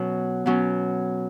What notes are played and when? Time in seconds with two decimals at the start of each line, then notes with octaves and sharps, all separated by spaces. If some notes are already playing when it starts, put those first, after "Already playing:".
Already playing: B2 F#3 C#4
0.46 B2 F#3 C#4